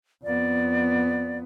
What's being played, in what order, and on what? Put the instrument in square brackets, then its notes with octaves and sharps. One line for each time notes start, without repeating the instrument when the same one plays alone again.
[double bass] F2 B3 [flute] D5